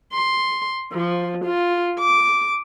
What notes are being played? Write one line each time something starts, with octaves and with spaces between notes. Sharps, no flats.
C6
F3
F4
D6